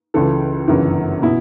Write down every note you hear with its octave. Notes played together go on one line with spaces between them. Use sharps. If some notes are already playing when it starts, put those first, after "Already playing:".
C#2 C#3 E3 A4
G1 F#2 C#3 E3
B2 E4